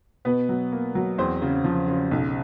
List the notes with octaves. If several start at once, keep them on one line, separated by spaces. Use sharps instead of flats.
B2 B3 B4
F#3
A#3
F#3
E2 C4 C5
C#3
F3
C#3
B1